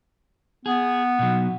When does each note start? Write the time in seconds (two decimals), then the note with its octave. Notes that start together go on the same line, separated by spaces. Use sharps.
0.66 B3 G#4
1.19 B2 F#3